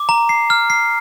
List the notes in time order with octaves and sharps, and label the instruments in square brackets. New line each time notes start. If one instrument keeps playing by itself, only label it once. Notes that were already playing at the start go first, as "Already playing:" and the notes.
Already playing: [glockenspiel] D6
A#5
C7
F6
C7